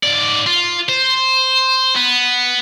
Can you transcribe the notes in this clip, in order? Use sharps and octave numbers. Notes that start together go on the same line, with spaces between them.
G#2 D5
F4
C5
B3